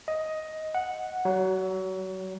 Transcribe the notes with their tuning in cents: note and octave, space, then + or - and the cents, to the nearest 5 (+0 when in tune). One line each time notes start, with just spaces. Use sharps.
D#5 +10
F#5 -5
F#3 +30